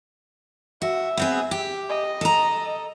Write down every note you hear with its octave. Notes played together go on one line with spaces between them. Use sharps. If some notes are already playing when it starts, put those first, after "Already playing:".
F#4 E5
B3 C4 G#4
G4
D#5
A4 A#5